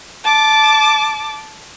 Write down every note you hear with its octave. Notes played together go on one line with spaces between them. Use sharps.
A5 D6